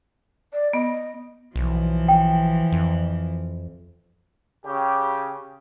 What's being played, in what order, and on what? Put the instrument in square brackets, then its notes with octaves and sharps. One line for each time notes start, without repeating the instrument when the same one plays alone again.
[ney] D5
[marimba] B3 [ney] D#5
[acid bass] B1 [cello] E3 F3
[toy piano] G5
[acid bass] F2
[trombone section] C#3 G4